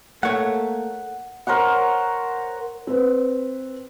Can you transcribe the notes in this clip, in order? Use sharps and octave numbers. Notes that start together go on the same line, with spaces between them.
A3 A#3 C#5 F#5
A#4 C5 C#5 F#5
C4 B4